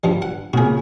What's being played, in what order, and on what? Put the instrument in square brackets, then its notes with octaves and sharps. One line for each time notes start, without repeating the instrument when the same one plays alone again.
[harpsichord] G2 F3 G3
F#5
[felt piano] A#2 C#3 [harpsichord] F#4 G#4